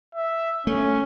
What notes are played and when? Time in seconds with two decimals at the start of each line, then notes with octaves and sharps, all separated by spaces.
0.15 E5
0.67 A3 C#4